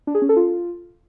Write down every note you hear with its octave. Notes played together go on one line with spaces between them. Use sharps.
D4
G#4
C#4
A4
F4